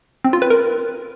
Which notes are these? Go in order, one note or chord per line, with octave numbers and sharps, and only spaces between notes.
C4
F4
B4
A#4